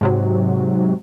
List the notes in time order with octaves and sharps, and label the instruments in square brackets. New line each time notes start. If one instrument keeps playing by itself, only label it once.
[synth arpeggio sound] G#2 C3 F#3